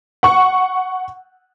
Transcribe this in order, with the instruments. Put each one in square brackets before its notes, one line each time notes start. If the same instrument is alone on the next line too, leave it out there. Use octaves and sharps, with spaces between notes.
[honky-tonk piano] F#5 C#6